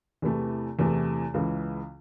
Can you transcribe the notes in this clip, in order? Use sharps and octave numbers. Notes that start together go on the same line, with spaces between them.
E2 C3 E3 A3
E2 C3 E3 A3
C#2 C#3 E3